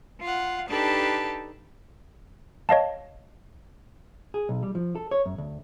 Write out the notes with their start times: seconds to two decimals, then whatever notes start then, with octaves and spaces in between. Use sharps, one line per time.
0.22 F4 F5 F#5
0.68 D4 D#4 G4 A4 B4 A5
2.69 C#5 D#5 F5 A5
4.34 G#4
4.49 B1
4.63 G3
4.75 F3
4.95 A4
5.11 C#5
5.26 F#2
5.38 D2